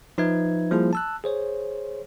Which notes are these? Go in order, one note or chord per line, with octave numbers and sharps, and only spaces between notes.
F3 D#4 B4 E5 G#6
F3 G3 A#3 E4 G#4
A5 E6 F#6
G#4 C5 C#5